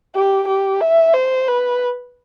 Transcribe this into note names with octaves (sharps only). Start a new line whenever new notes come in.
G4
G4
E5
C5
B4